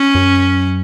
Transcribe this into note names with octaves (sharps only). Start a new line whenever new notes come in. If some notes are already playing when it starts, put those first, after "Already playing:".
Already playing: C#4
F#2